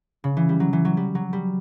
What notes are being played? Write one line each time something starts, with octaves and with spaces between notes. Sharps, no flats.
C#3
E3
G3
F#3
E3
F#3
G3
F#3
G3